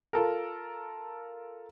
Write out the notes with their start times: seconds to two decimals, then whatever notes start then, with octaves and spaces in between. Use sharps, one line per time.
0.13 F4 A4 A#4